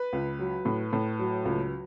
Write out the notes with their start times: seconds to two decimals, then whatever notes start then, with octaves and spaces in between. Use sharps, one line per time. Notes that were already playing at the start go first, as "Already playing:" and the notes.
Already playing: B4
0.13 C#2
0.39 F#3
0.65 A2
0.93 A2
1.19 F#3
1.45 C#2